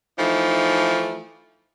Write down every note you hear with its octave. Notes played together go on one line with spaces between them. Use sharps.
E3 F3 A3 D#4